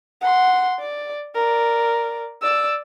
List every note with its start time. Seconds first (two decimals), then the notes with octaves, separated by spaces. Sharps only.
0.22 F#5 C6
0.79 D5
1.35 A#4 D5
2.42 D5 E6